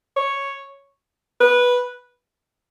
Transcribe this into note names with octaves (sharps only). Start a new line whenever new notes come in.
C#5
B4